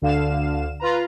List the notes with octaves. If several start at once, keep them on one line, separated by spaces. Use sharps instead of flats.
D2 D3 F5 E7
F4 B4 A#5